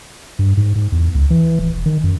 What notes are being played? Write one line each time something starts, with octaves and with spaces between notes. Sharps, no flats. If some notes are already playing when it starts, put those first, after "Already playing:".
G2
G#2
G#2
E2
C#2
E3
D1
E1
D#3
F#2